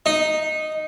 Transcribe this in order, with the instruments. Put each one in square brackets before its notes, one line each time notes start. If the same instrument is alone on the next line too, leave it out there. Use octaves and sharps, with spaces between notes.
[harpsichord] D#4